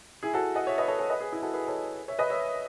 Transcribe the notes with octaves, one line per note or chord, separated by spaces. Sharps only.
E4 G#4
F#4 A4
D#5 F#5
C#5 E5
B4 D#5
A4 C#5
A4 C#5
B4 D#5
G#4 B4
E4 G#4
F#4 A4
G#4 B4
A4 C#5
C#5 E5
B4 D#5
C#5 E5